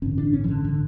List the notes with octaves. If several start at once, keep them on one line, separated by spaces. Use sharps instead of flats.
A1 G2 D3 C#4
D4
C#4
E3
D3
D3